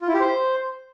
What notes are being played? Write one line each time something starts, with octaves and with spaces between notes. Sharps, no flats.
F4
E4
G4
C5